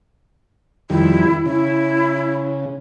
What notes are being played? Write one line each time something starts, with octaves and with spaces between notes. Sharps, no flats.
F2 D#3 G3 E4
C#3 E4